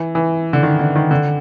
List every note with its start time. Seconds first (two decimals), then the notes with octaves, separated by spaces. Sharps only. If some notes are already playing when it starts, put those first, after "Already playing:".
Already playing: E3
0.15 E3
0.53 D3
0.63 D#3
0.79 D3
0.96 D#3
1.11 D3